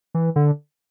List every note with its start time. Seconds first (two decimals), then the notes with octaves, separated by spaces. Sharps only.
0.14 E3
0.36 D3